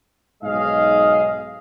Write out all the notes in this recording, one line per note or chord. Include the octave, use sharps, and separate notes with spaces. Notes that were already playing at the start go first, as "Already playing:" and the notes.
B1 G#2 G#3 G#4 D#5 F5